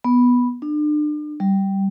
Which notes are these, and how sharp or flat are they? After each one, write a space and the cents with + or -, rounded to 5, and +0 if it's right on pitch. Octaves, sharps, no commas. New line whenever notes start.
B3 -5
D4 +35
G3 -10